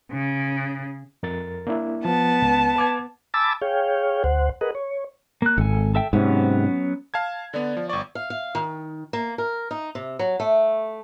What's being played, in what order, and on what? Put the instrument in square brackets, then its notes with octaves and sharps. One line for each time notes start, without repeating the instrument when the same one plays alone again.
[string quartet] C#3
[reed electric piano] F2 A#4 A6
A#3 D4 E4
[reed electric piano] F3 [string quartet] B3 A5
[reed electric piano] C#2
B4 D6 G#6
[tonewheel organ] G#5 A5 B5 D6 E6 A6
G#4 C#5 F5 G5
D2 C5 F#5
G#4 A#4 B4 D#5 F#5
C#5
[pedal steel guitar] A#3 F#6
[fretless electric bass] G#1 [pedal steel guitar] A4 G#5
[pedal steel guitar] A4 E5 G5
[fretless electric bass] G#2 C3 [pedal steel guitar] F#3 B3 C#4
[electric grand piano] F5 A5 G#6
[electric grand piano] D3 B3 [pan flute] D5
[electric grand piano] F3
[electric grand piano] G1 D5 [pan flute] C#6
[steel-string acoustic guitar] F5
F5
D#3
A#3
A#4
D#4
C3
F#3
A3